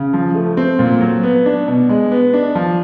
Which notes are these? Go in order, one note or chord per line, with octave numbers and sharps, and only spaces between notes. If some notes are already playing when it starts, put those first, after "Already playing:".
Already playing: C#3
F3
A3
C4
A#2
F#3
B3
D4
B2
G#3
B3
D4
F3